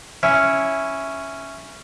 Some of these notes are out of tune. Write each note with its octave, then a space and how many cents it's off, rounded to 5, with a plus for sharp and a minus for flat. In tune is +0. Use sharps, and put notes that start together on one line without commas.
C#4 +0 E4 +0